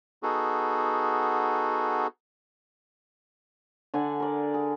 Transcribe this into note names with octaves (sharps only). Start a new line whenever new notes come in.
B3 D#4 F#4 G#4 A4
D3 D5 F#5 G#5
A#4 D5
G#4